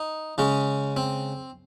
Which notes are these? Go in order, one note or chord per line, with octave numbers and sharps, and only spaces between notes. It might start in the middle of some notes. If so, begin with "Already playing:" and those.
Already playing: D#4
C#3 G#3 C#4
C4